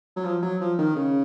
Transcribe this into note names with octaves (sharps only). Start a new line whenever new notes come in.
F#3
F3
F#3
F3
D#3
C#3